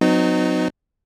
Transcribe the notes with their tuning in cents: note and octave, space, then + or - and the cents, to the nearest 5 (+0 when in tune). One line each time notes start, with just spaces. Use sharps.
F#3 -20 B3 +45 D#4 -20